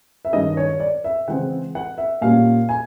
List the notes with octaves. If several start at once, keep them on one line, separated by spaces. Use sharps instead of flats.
E5
G2 D#3 G#3 C#4 D#5
C#5
D5
E5
C#3 E3 G#3 C4 F#5
F#5
E5
A#2 G3 A#3 C#4 F5
G#5